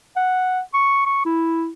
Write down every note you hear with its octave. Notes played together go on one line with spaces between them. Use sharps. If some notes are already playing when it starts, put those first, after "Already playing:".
F#5
C#6
C#6
E4